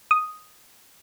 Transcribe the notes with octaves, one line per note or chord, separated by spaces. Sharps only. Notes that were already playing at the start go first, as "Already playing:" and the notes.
D#6